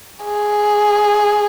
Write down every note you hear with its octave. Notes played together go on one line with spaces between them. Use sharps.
G#4